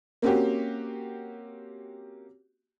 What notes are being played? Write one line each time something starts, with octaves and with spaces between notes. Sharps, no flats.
A#3 C4 C#4 F#4 G4